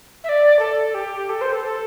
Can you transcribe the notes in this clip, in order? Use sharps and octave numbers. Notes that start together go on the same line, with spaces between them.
E5
D5
A4
G4
A4
C5
A4
A4